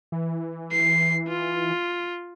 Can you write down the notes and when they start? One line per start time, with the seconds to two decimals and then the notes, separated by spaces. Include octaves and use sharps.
0.12 E3
0.72 C7
1.28 F4